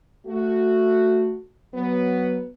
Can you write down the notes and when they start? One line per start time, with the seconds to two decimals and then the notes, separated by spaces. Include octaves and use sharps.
0.26 A3 F#4
1.74 F#3 B3